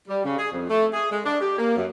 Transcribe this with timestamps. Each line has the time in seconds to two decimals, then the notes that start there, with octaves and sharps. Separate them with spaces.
0.08 G3
0.25 C#3
0.37 G#4
0.52 F2
0.69 A3
0.94 G#4
1.11 G#3
1.26 D4
1.41 G4
1.58 A#3
1.77 F#2